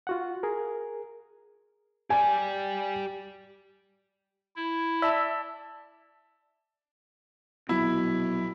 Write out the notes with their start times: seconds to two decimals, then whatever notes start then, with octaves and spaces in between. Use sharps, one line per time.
0.07 F4 F#4 F#5
0.43 G#4 A#4
2.10 G4 D5 G#5
4.56 E4
5.02 D5 E5 A5
7.69 A#1 B2 F#3 C4 E4